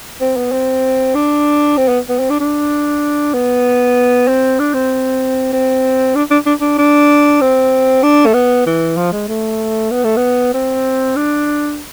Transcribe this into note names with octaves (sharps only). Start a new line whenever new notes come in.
C4
B3
C4
D4
C4
B3
B3
C4
D4
D4
B3
C4
D4
C4
C4
D4
D4
D4
D4
D4
C4
D4
A3
B3
E3
F3
G#3
A3
B3
A3
B3
C4
D4